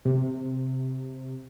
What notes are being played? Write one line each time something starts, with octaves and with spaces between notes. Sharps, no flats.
C3